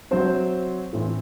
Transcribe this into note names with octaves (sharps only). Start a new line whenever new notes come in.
C3 F#3 C4 C5
A2 E3 C4